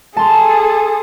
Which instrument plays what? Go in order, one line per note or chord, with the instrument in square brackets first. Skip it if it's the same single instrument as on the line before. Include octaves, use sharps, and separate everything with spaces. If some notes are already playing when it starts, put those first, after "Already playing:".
[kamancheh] G#4 A4 [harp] A5 C6